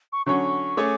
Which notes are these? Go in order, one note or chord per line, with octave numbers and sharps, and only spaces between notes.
C#6
D3 F#3 C#4 C#6
A3 C#4 G#4 C#5 D6